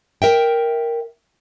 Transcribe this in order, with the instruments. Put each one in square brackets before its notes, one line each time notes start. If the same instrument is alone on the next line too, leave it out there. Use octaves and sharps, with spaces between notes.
[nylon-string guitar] A#4 E5 G5